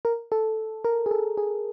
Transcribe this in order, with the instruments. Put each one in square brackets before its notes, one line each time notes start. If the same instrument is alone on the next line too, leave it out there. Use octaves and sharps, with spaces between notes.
[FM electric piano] A#4
A4
A#4
G#4
A4
G#4